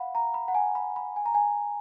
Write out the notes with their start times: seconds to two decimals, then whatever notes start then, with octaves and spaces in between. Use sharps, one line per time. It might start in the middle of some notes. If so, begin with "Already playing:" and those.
Already playing: F5 F#5 B5
0.15 A#5
0.34 B5
0.48 F#5
0.55 G#5
0.75 B5
0.96 B5
1.16 G#5
1.26 A#5
1.35 G#5